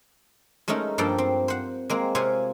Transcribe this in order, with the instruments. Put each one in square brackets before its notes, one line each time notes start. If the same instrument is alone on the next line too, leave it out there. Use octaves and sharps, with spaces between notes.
[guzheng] G#3 A3 C#4 D#4 A#4
G2 F3 A#3 A4 G5 A5
C4
C5 F#5
G#3 A#3 C4
C3 F4 C5 C#5 G#5